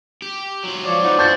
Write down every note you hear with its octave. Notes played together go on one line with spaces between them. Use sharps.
G4
F#3 F4
F3 C#5 D5
E3 D#4 F4 C5 F#5
D4 G6 A6 C#7